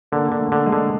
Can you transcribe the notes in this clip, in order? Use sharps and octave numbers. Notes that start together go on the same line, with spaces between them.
D3 A#3
D3
A3
D3
G#3
D3